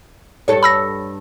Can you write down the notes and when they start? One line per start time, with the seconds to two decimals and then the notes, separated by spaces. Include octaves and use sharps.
0.48 G2 A4 C#5
0.63 B5 E6 A#6